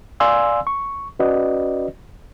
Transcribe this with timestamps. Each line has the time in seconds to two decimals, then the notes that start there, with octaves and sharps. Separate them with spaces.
0.20 D5 F5 G#5 C6 E6
0.67 C#6
1.19 C#4 F#4 B4 D5 D#5